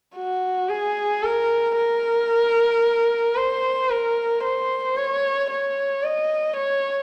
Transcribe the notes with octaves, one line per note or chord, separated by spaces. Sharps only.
F#4
G#4
A#4
A#4
C5
A#4
C5
C#5
C#5
D#5
C#5